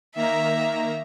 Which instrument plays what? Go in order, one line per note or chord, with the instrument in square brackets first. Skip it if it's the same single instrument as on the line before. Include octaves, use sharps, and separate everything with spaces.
[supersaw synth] D#3 A#3 A#5 [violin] E5